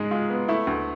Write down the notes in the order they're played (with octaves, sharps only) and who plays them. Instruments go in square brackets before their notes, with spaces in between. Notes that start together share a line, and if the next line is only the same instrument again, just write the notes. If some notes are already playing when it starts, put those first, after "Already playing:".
Already playing: [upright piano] G#2 G#3 G#4
G#3 F4
B3
A3 E4
D2